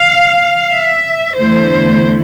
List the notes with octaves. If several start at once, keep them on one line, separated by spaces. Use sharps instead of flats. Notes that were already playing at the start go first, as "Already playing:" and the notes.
Already playing: F5
E5
E2 D3 A3 E4 C5